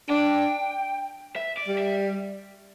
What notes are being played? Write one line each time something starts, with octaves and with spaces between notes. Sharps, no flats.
D4 G5
E5
D5
G3
E5